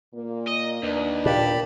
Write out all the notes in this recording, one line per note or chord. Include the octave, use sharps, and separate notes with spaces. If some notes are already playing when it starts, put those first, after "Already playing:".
A#2 A#3
D#5
D#2 D4 B4
A#2 G4 A5 B5